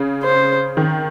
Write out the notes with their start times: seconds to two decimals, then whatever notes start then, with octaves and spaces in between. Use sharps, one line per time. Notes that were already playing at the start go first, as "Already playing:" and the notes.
Already playing: C#3
0.23 C5
0.77 D#3